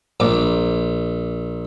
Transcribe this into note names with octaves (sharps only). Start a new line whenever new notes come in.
A#1 D6